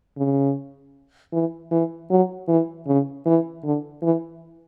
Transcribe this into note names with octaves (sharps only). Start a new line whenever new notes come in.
C#3
E3
E3
F#3
E3
C#3
E3
D3
E3